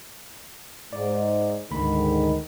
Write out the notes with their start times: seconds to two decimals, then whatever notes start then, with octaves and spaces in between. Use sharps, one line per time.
0.93 G#2 D5
1.71 D2 G#2 D3 D#3 B5